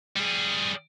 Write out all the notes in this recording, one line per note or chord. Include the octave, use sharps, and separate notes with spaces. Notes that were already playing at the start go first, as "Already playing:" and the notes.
G3 G#4